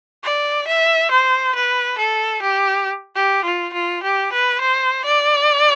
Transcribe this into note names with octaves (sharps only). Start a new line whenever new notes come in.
D5
E5
C5
B4
A4
G4
G4
F4
F4
G4
B4
C5
D5